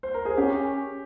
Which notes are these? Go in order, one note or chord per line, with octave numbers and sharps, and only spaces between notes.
C5
A#4
G#4
C#4 G4